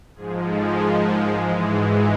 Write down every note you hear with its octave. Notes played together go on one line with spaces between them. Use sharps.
G#2 F3 G#3 G#4
A4
A#4
A#4
G#2 E3 G#3 F4
F#4